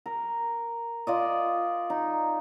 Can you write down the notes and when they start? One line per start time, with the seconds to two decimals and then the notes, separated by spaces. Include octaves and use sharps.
0.06 A#4
1.07 F4 D5 D#5
1.90 D#4